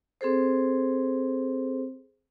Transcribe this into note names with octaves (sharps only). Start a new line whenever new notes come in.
C4 G#4 A4 C5